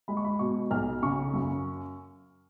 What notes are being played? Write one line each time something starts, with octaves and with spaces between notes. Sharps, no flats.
G#3 B5
C#6
B5
B2 C#6
B1 F6
C#3 C#6
F#2